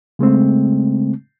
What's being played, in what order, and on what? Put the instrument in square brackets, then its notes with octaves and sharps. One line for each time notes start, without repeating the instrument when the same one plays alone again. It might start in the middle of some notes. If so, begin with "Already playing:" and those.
[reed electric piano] C#3 G#3 A3 C4